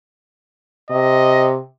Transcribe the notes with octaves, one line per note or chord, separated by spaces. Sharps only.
C3 D#5